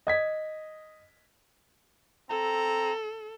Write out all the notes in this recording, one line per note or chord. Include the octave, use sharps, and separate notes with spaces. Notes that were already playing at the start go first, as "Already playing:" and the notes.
D#5 G#6 B6
C4 A4 A#5